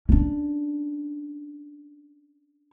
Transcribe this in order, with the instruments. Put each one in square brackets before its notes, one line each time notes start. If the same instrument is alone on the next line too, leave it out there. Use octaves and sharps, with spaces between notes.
[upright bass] C#4 D4